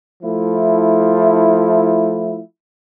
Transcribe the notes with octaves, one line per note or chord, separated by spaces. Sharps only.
F3 A3 E4